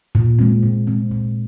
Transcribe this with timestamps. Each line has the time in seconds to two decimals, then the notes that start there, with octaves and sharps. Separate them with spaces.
0.15 A#2
0.39 G#3 C4
0.63 A#2
0.87 G#3 C4
1.11 A#2